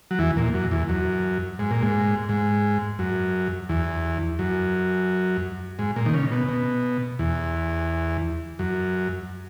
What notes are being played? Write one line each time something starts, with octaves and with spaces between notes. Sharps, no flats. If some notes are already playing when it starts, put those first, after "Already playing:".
F#3
E2 E3
A#2
F#2
E2
F#2
G#2
A#2
G#2
G#2
F#2
E2
F#2
G#2
A#2
D#3
C#3
B2
B2
E2
F#2